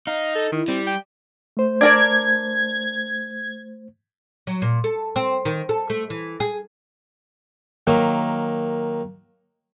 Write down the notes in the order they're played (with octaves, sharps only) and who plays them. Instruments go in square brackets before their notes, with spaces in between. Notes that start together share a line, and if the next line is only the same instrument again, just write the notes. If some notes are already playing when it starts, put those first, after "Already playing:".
[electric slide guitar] D#4 [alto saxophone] F5
[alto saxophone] A4
[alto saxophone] D#3 [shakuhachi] E4
[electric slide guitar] G3 [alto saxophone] C4
[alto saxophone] G5
[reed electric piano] A3 C5
[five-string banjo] D4 A#4 D5 [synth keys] G#6
[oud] F#3
A#2
A4
C4
D#3
A4
A3
E3
G#4
[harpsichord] D#3 F#3 A#3